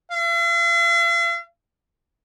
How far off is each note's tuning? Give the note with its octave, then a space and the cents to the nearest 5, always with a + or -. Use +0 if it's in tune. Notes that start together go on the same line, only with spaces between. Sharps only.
F5 -45